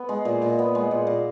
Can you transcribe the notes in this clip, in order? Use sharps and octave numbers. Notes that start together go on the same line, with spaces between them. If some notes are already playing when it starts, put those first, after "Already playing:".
Already playing: B3
G#3
A#2
A#2
B3
G#3
A#2
A#2